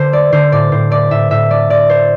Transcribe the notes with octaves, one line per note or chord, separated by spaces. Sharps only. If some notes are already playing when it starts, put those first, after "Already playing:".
Already playing: D3 C5
A3 D5
D3 C5
A2 D5
A2 C5
A3 D5
A2 E5
A2 E5
A3 D5
A2 D5
A3 C5